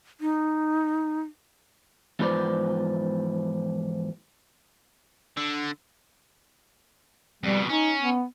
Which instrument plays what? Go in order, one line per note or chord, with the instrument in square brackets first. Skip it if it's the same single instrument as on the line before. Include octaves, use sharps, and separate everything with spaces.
[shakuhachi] D#4
[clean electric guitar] E2 G#2 F3 B4 C5 D5
[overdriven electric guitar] D3
[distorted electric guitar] F2 B2 [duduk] G3
[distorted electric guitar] C#4 [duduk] D#4
[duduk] B3